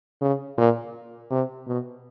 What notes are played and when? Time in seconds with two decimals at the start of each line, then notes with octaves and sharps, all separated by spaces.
0.22 C#3
0.58 A#2
1.31 C3
1.67 B2